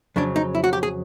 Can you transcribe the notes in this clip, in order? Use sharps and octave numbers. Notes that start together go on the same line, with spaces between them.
F2 C#3 F#3 D4
D#4
E4
F#4
G4
G#4